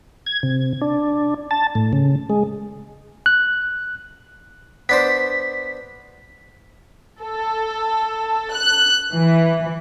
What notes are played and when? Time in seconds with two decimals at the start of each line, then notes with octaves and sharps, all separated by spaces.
0.26 G#6
0.43 C3
0.81 D4
1.51 A5
1.75 A2
1.93 C#3
2.30 G#3
3.26 F#6
4.89 B3 D4 C5 B6
7.23 A4
8.54 F#6
9.12 E3